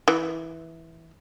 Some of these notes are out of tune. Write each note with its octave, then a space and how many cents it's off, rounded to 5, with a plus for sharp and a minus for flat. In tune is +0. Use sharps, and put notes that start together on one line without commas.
E3 -10